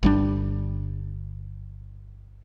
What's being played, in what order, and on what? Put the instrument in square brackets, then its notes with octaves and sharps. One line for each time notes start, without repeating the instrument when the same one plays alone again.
[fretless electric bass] G1 G3 D4